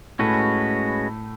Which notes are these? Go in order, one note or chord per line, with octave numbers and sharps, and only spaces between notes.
A2 G#3 A3 C#4 F#4 B4